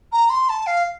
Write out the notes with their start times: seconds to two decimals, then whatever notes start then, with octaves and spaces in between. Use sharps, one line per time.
0.12 A#5
0.29 C6
0.49 A5
0.66 F5